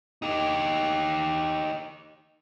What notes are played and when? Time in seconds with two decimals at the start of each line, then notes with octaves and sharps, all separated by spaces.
0.22 D#4 G4